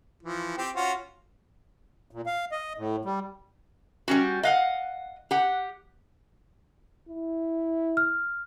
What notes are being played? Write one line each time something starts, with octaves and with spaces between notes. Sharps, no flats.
E3 F3
C4 G4
C#4 F4 F#4
A#2
F5
D#5
A2
G3
G3 C#4 F#4
D#5 F5 F#5
G4 F#5
E4
F6